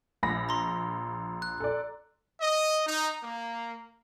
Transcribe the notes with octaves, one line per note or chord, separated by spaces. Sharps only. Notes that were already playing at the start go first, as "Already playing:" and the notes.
A#1 B5 A#6
A#5 C6
F#6
A4 D5
D#5
D#4
A#3